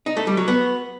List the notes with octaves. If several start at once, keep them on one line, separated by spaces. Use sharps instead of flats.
D#4
A3
G3
F#3
B3